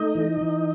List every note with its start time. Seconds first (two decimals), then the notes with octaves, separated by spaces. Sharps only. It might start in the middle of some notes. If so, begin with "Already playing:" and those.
Already playing: A3 D#4 D#5
0.15 E3
0.41 E3